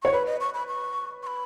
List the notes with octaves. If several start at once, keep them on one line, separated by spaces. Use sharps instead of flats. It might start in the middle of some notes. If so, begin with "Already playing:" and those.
C#5 C#6
B4 B5
D#5
C#6
B5
C#6
C#6
B5